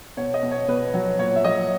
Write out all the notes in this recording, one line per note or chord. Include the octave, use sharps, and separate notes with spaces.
B2 C#5
D#5
B2
C#5
B2 B4
F#3
A#2 C#5
E5
F#3 D#5